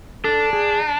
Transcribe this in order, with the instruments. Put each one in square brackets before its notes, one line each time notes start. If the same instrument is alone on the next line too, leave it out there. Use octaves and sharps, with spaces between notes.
[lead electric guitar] D4 [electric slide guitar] A4
[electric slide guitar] G#4